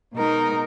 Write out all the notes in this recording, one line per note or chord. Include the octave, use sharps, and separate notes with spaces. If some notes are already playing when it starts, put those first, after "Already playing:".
B2 G#3 B3 D#4 A#4